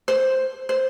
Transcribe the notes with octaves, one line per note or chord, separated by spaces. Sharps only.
C5
C5